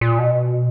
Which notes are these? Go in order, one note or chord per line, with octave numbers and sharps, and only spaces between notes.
A#2
B2